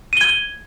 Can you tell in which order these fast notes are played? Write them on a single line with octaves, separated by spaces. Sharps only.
D#7 G7 G#6